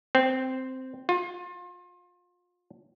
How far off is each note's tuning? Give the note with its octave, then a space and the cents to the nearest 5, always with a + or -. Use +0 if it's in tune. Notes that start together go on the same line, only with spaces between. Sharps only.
C4 -5
F4 +30